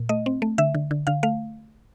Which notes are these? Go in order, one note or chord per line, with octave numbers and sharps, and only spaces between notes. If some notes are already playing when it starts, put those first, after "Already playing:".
Already playing: A#2
A3 D#5
C4
A3
D3 E5
D3
D3
D3 F5
A3 F5